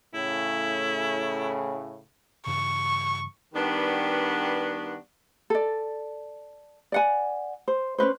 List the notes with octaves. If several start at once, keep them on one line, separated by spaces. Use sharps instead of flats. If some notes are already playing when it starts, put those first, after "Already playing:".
A2 C#3 E4
G2 C#3 E3 C#6
D#3 G3 B3 D4 F#4 B4
A4 D5
D5 F#5 G#5
C5
C#4 D4 B4 C5